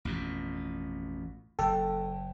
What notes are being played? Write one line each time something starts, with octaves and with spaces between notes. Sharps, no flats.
A1 F2 B2
F#1 A4 G5